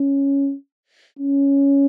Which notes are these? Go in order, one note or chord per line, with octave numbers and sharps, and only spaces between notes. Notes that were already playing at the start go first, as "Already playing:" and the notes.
Already playing: C#4
C#4